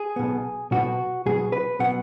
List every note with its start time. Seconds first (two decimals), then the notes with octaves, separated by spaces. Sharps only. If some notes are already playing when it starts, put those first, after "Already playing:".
Already playing: G#4
0.16 B1 B2 B3
0.71 B1 B2 B3 F#4
1.26 B1 B2 F#3 B3 G#4
1.52 B4
1.79 B2 F#3 B3 F#5